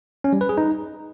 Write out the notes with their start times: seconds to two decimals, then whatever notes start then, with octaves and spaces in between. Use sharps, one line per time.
0.24 C#4
0.33 G3
0.41 B4
0.49 G#4
0.57 D#4